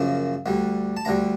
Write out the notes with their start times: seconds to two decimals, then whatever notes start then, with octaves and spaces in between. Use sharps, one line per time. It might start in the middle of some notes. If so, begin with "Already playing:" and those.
Already playing: F#2 C#3 F3 A#3
0.46 D2 D3 G3
0.97 A5
1.05 D2 D3 G3 A#5